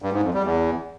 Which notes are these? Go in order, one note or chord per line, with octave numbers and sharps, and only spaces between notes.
G2
G#2
F2
G3
E2